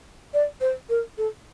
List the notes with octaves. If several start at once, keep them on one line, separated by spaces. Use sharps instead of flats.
D5
C5
A#4
A4